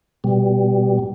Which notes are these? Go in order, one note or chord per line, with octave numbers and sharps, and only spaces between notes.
B2 G3